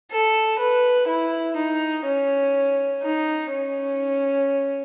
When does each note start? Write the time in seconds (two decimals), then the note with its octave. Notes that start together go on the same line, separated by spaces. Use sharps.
0.11 A4
0.59 B4
1.08 E4
1.56 D#4
2.05 C#4
3.02 D#4
3.51 C#4